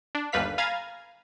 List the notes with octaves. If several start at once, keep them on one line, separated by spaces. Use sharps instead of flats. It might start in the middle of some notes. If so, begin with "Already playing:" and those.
D4
G1 D#2 G3 B4 F5 B6
F5 G#5 A#5 B5 G#6 A6